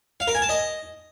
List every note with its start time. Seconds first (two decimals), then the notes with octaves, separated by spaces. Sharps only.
0.20 F5
0.27 A#4
0.35 G#5
0.42 A5
0.49 D#5